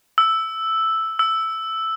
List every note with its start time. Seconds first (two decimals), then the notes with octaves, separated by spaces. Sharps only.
0.18 E6
1.19 E6